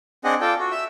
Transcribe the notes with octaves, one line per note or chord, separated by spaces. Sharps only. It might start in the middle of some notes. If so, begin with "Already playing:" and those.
C4 D4 G#4 D#5 F#5
F4 A4 D5 G5
F#4
E5 E6